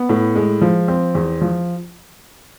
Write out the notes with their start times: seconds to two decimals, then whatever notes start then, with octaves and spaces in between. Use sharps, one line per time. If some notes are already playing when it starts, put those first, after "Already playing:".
Already playing: B3
0.09 A2
0.36 G#3
0.62 F3
0.88 C4
1.15 E2
1.41 F3